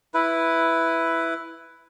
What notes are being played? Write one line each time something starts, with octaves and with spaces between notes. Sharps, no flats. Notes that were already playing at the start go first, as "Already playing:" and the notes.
E4 B4